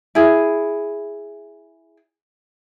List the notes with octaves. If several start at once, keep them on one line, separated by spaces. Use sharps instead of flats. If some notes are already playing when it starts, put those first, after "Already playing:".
E4 G#4